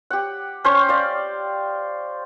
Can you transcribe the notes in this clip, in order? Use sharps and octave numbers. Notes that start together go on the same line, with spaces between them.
G4 F#5
C#4 C5 C#6
D5 F5